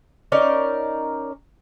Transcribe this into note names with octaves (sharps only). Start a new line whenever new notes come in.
C#4 D#4 A#4 D5